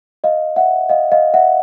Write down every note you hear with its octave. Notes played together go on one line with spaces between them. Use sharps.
D#5 F5
E5 F#5
D#5 F5
D#5 F5
E5 F#5